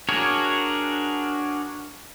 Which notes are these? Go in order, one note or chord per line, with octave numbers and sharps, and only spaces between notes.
D4 F#4 G#4 A#4 C#5